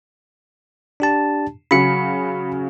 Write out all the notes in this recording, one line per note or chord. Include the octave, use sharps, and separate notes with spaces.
D4 G4 A5
C#3 F#3 B5 C#7